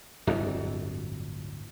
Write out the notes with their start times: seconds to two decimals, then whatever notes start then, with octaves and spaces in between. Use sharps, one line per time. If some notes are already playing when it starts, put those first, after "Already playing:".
0.27 D1 G1 F2